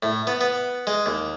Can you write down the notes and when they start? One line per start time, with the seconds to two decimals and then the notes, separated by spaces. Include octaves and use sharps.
0.03 A2
0.27 B3
0.41 B3
0.87 G#3
1.06 D#2